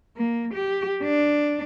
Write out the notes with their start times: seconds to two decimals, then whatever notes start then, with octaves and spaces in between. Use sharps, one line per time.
0.16 A#3
0.54 G4
1.04 D4